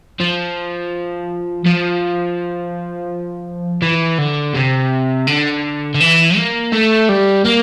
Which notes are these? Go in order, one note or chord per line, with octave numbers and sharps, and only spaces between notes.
F3
F3
E3
D3
C3
D3
D3
E3
A#3
A3
G3
A#3